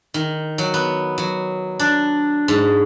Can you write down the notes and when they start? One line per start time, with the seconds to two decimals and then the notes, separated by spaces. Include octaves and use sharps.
0.14 D#3
0.58 F#3
0.74 B3
1.18 F#3
1.79 D4
2.48 G#2